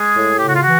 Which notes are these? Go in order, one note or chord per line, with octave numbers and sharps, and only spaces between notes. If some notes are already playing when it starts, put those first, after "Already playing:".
Already playing: G#3 G#4
A2
C#3 G4
F#4
F4
E3 F#4